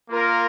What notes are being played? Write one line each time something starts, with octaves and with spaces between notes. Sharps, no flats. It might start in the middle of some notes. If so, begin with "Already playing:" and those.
A#3 F4 A#4